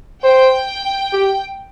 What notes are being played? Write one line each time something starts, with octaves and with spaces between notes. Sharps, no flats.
C5 G5
G4